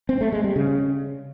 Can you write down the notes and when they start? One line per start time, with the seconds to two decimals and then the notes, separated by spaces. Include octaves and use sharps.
0.09 C4
0.21 A3
0.32 G#3
0.44 G3
0.56 C#3